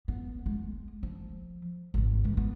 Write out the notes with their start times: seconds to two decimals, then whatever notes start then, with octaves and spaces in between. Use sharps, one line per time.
0.08 B3
0.46 G#3
1.03 F3
1.94 G#1 G2
2.24 E3 G#3
2.37 B3